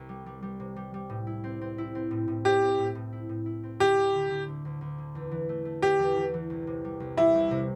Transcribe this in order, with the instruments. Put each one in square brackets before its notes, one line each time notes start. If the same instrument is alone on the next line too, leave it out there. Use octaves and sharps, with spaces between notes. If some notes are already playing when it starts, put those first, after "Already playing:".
Already playing: [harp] C2
G3
G3
G3
C3
G3
G3
A2
E4
C4
C4
E4
C4
A2
A2
[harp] C4 [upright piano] G4
[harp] C4
A2
A2
E4
A2
E4
C4
[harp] D2 [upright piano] G4
[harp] D2
D3
D3
D2
D2
D2
D3
E2
E3
A3
A3
[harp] A3 [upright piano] G4
[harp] E2
E2
E3
C2
C3
G3
C2
[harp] G3 [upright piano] E4
[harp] C2
C3